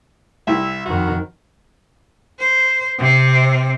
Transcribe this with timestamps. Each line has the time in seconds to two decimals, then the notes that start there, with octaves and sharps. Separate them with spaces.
0.47 C2 E4 E5
0.85 F2 D#3 F#4
2.39 C5
2.99 C3 C4